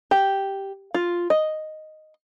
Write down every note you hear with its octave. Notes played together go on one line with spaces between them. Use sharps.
G4
F4
D#5